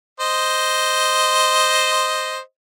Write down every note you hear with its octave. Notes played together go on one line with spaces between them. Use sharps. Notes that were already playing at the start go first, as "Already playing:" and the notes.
C5 D#5